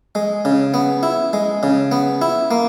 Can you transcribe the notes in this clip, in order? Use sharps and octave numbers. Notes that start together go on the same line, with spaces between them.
G#3
C#3
B3
E4
G#3
C#3
B3
E4
A#3